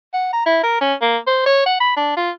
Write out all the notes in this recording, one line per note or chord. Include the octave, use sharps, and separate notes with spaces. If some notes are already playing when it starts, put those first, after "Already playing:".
F#5
A#5
E4
A#4
C#4
A#3
C5
C#5
F#5
B5
D4
F4